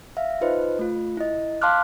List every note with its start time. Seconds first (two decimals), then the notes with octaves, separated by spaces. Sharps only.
0.17 E5 F5
0.41 D#4 F4 B4 C5 D#5
0.79 A3 F4
1.17 E4 D#5
1.62 F5 A5 C6 D6 F6 F#6